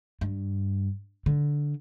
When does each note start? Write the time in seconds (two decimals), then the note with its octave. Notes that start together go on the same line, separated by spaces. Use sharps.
0.21 G2
1.26 D3